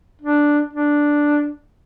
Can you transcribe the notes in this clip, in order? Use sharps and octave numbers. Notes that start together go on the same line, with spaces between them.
D4
D4